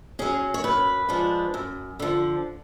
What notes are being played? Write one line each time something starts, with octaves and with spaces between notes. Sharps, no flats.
F#3 C#4 G#4
C#5
F#2 B4
F3 G#3 D4
F#2
D3 F3